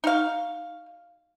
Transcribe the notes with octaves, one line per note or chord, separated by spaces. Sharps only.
D#4 F#4 F5